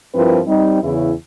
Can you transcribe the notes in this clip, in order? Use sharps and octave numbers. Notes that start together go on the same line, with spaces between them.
G2 F3 C4 E4 A#4 B4
G3 C4 D#4
E2 C#3 E4